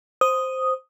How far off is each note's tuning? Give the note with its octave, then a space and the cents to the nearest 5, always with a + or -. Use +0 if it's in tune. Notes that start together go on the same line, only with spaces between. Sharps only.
C5 +0 D#6 +0